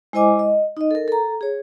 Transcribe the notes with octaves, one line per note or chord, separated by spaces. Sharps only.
G#3 E4 C5 D#5 G#5 D6
D#5
D#4 D#5
A4 A#4
A4 A#5
G#4 C#5